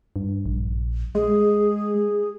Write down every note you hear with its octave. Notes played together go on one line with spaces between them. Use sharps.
G2
A#1
G#3 G#4